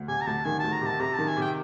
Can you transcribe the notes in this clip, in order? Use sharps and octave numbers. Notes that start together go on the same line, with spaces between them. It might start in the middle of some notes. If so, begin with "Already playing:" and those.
Already playing: D2
C3 G#5
A#5
D2 A5
D#3 G#5
D2 A5
A#5
C3 A5
C3 A#5
D#3 A5
G#5
C3 G5